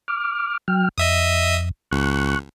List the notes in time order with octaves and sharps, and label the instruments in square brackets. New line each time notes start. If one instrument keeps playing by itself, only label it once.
[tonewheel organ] D6 F6
F#3 G5 F6
[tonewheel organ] F2 [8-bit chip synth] D#5 E5 D#6
[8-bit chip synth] C#2 [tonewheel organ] C#6 F#6